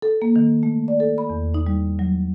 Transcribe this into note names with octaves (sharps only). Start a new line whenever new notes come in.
A4
A#3
D#3
A3
D5
A4
B5
E2
D#4
G3
F#3